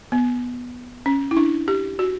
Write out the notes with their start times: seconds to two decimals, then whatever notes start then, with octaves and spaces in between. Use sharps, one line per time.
0.12 B3
1.06 C#4
1.31 E4
1.37 D4
1.68 G4
1.99 F#4